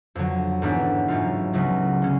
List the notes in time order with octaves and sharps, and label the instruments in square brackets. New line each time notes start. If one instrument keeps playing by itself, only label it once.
[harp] F2 D3 F#3
A1 G#2 F#3 B3 D4
A1 G#2 F#3 A3 F4
C#2 C#3 F#3 B3 F#4
D3 G#3 C#4